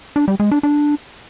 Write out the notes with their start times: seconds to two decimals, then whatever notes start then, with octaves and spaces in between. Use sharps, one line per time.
0.16 D4
0.28 G3
0.40 G#3
0.52 D4
0.63 D4